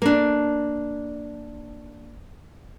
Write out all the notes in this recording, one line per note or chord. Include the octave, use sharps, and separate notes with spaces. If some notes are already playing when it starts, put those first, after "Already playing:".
A#3 D4